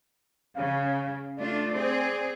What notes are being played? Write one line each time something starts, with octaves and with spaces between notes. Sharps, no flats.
C#3 F5
A3 D4 F4 D5
C4 G#4